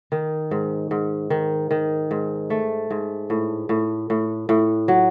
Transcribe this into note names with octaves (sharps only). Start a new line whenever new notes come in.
D#3
G#2
G#2
D#3
D#3
G#2
A3
G#2
A2
A2
A2
A2
F#3